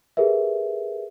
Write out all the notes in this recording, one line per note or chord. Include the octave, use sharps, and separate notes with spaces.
G4 G#4 A#4 B4 E5